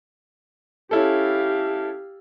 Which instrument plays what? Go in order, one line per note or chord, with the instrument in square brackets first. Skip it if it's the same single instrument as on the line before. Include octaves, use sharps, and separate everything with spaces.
[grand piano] C#4 E4 A4 [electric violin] G4 F5